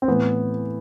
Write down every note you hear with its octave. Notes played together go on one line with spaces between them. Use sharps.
C4
A2 E3 B3